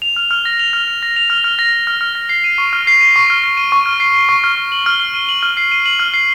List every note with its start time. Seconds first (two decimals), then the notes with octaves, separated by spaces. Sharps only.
0.02 F7
0.16 F6
0.31 F6
0.45 A#6
0.59 F7
0.73 F6
0.88 F6
1.03 A#6
1.16 F7
1.30 F6
1.44 F6
1.59 A#6
1.73 F7
1.87 F6
2.01 F6
2.15 A#6
2.29 C7
2.44 D#7
2.58 C#6
2.73 F6
2.87 C7
3.01 D#7
3.16 C#6
3.30 F6
3.44 C7
3.57 D#7
3.72 C#6
3.86 F6
4.00 C7
4.15 D#7
4.29 C#6
4.44 F6
4.57 D#7
4.72 F#7
4.86 F6
5.00 C7
5.14 D#7
5.29 F#7
5.43 F6
5.57 C7
5.72 D#7
5.86 F#7
5.99 F6
6.14 C7